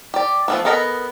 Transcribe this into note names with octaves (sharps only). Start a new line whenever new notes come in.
G4 D5
F3 A3 B3
B3 A4 A#4 D#5 B5